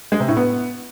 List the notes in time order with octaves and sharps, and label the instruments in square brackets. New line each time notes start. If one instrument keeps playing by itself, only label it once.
[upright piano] G#3
C3
A2
B3